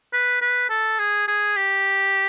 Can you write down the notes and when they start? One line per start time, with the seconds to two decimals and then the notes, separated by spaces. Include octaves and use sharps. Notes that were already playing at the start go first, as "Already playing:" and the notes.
0.13 B4
0.42 B4
0.70 A4
0.99 G#4
1.28 G#4
1.56 G4